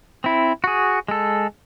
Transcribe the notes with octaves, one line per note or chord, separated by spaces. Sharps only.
C4 E4
F#4 G#4
G#3 A4